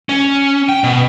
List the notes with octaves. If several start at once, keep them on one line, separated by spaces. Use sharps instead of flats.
C#4
G5
B2